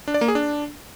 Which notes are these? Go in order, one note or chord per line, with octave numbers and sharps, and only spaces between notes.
D4
D5
A#3
G#4
D4